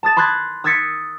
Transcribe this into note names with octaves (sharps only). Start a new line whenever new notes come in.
A5 D#6 A6 E7
B5 C6 D6 F#6 G#6 A6
D#6 E6 G#6 A6 B6 C#7